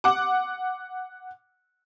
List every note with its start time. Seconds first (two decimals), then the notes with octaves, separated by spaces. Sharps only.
0.04 F#5 D6